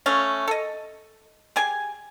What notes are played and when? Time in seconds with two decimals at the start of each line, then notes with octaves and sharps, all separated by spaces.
0.06 A3 C#4 F5
0.48 A4 D#5
1.56 G4 G#4 G#5